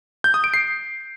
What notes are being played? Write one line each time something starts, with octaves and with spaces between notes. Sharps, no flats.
G6
D#6
D7
C7